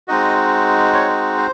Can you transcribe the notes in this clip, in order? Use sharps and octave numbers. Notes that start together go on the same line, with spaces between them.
G#3 C4 D#4 F#4 D#5
C#5
C5